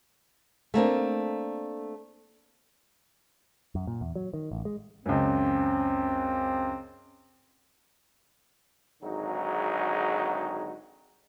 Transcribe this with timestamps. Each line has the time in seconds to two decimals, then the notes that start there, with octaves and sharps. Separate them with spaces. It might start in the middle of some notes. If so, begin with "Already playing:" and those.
0.74 A3 A#3 C4 D4
3.75 F#2
3.87 A#2
4.01 E2
4.15 F#3
4.34 D#3
4.51 A1
4.65 G#3
5.06 C#2 F#2 C4
9.02 G#1 D3 F#3 D#4 G#4